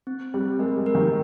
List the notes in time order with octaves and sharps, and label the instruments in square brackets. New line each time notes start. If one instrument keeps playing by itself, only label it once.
[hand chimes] C4
[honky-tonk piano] G3 [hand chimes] C4
[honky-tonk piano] G#3 [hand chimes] A#4
[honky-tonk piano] G#3
[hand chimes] A#4
[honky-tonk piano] D#3